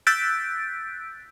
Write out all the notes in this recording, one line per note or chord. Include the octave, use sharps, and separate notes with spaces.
E6 F#6 G6 A6 B6 D7